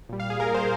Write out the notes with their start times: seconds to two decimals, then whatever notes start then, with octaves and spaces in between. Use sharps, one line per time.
0.09 A#2 G3
0.20 F5
0.30 G#4
0.40 A#4
0.54 C5